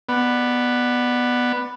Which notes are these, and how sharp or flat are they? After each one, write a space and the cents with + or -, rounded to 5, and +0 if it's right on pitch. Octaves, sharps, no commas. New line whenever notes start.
B3 +0 D5 +20